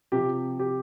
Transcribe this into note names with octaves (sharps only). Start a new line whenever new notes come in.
C3 F3 G4
G4